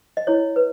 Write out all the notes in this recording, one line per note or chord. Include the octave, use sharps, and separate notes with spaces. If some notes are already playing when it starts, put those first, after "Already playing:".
D#5
E4 C#5
B4